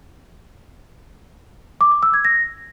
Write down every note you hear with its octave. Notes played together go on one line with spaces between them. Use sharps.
D6
D6
E6
G#6
A#6